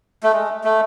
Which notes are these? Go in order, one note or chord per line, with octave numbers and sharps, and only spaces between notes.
A3
G#3
A3